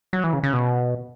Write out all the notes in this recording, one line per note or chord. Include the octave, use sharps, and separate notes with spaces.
F#3
E3
C#3
C#3
B2